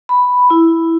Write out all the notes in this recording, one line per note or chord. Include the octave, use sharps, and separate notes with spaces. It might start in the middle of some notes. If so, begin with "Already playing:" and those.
B5
E4